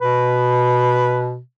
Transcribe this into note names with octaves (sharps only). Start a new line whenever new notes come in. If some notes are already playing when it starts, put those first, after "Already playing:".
B2 B4